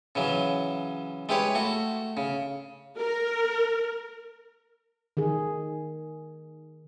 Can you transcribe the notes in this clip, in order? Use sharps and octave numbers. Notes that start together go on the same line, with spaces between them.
C#3 E3 F#3
G#3 E4 G4 B4 C#5
A3 F#4
C#3
A#4
D#3 G#4